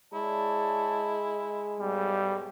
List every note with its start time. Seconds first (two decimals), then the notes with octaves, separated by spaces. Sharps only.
0.14 G#3 E4 C#5 D5 A5
1.80 B1 G#2 G3